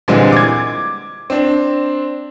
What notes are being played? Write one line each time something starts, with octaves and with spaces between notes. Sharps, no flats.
A#2 D3 E3 G3 G#3 C4
D6 G#6
C4 D4